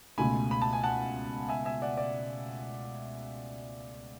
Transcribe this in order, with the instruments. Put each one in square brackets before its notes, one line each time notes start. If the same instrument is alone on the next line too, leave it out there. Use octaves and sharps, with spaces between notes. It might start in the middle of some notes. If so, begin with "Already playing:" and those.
[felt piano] C#2 B2 A3 [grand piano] G#5 B5
[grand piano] B5
A5
G#5
F#5 A5
E5 G#5
E5 G#5
D5 F#5
D5